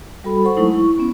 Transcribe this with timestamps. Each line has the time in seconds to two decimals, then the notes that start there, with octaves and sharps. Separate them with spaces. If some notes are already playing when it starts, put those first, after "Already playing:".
0.24 G3 F#4 A4 B5
0.44 A4 C5 F#5 C#6
0.57 F#3 G#3 A3 D#4 E4
0.72 E4 C#6
0.98 B3 C#4